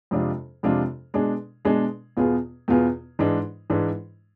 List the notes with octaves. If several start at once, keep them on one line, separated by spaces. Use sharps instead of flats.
F2 C3 G#3 D4 F4
F2 C3 G#3 D4 F4
B2 G#3 D4 G#4
B2 G#3 D4 G#4
E2 B2 B3 F4 G#4
E2 B2 B3 F4 G#4
G#2 E3 G#3 D4
G#2 E3 G#3 D4